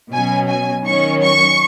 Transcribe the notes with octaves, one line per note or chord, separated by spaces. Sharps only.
B2 F#3 C#4 G#5
G#5
D#3 F#3 C#4 C#6
C#6